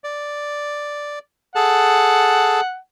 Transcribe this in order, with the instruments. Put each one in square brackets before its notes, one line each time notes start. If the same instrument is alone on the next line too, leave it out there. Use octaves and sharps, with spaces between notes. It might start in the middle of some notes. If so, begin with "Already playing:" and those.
[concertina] D5
[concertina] G#4 A4 A5 [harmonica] F#5